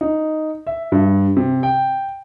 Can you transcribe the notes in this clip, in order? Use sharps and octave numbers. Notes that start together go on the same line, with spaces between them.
D#4
E5
G2
C3
G5